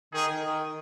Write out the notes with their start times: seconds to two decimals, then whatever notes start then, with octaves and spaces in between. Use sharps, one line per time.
0.13 D#3 D#4 G#4
0.28 D#3
0.44 D#3